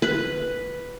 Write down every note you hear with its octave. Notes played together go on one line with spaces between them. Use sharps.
B4